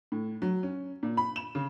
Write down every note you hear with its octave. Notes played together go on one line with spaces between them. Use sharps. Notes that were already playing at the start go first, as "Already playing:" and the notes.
A2
F#3
C#4
A#2
B5
E7
C#3